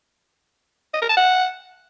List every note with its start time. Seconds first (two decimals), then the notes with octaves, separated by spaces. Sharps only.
0.94 D#5
1.02 A#4
1.09 A5
1.17 F#5